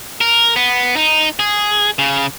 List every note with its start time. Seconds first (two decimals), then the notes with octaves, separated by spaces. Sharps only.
0.21 A#4
0.56 B3
0.96 D#4
1.39 G#4
1.99 C#3